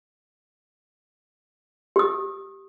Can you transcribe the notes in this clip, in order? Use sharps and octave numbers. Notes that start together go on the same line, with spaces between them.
G4 D#6